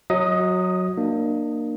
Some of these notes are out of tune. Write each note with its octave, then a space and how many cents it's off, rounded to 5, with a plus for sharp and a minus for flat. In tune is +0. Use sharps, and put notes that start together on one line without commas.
F#3 -10 D#5 +25 D#6 +0
A#3 +0 D4 +35